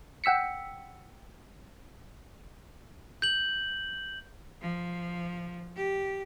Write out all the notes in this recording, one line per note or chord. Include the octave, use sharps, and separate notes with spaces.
F#5 G5 E6 B6 C#7
G6 F#7
F3
G4